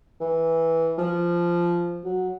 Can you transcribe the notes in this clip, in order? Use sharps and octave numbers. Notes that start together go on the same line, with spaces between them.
E3
F3
F#3